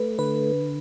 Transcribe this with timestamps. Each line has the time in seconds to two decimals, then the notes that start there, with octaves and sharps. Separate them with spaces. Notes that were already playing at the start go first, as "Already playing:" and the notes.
Already playing: A3 B4
0.19 D3 B4